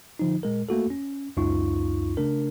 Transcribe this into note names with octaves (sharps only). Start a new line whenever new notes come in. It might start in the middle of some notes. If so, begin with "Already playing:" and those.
D3 F3 D#4
A#2 G#3 A#4
A3 A#3 F#4 A4
C#4
C#2 F#2 D#4 F4 C#6
C#3 A3 D4 A#4